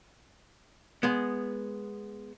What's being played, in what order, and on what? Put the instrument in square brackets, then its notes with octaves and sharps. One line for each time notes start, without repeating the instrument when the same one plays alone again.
[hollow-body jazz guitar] G#3 B3